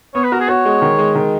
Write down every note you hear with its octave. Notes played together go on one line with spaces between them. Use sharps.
B3 C#5
B4
F#4 A#4
G#4
F#4 C#5
G#3
D#3
G#3
D#3